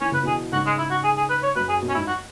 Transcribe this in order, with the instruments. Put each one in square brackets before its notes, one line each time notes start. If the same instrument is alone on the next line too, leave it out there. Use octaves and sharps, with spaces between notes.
[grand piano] E3 [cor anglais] C#4
[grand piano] C#3 [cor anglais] B4
[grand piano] B2 E3 [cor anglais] G#4
[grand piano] G#2 C#3 [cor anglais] F#4
[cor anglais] G#3
E4
F#4
G#4
G#4
B4
C#5
[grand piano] F#2 [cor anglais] B4
[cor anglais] G#4
[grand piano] B2
[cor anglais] C#4
[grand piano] G#2 [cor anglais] E4
[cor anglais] F#4